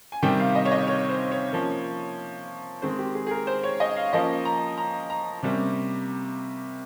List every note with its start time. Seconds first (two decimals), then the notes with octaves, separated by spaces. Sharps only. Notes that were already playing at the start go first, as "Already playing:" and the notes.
0.12 G#5
0.22 C3 D#3 G3 G5
0.39 F5
0.55 D#5
0.65 C#5
0.72 D#5
0.87 C#5
1.09 C5
1.32 C#5
1.53 F3 A#3 C#4
2.82 D#3 G#3 C4 C5
2.99 G4
3.15 G#4
3.27 G#4
3.31 A#4
3.47 C5
3.63 C#5
3.80 D#5
3.96 F5
4.13 F3 A#3 C#4 D#5
4.45 A#5
4.78 A#5
5.10 A#5
5.43 C3 G3 A#3 C#4